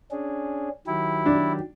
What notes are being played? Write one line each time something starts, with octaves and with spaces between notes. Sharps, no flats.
C#4 D4 G#4
D#3 F#3 E4 G4
D4